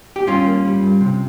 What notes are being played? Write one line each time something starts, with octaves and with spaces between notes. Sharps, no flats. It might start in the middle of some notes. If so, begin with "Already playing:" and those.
G4
G2 C#4 F4
A#3
G3
G2
C3